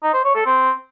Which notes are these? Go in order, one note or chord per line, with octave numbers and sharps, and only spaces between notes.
D#4
C5
C#5
A4
C4